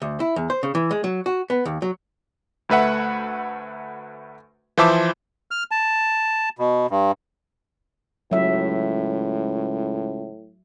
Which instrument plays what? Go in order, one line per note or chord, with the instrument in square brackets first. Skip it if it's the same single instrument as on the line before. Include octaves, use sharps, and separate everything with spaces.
[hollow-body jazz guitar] D2
E4
E2
C5
C#3
E3
G#3
F#3
F#4
B3
D#2
F#3
[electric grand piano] D2 A3 B4 E5 F#5
E3 F3 C5 E5 A5 D6
[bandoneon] F6
A5
B2
G2
[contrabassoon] C#2 [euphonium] A2 [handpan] F#3 E5